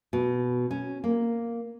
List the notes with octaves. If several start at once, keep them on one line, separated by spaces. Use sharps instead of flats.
B2
C#4
A#3